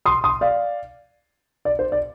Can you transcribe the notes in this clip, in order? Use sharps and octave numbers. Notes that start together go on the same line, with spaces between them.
C6 D#6
C6 D#6
D5 F5
D5
C5
D5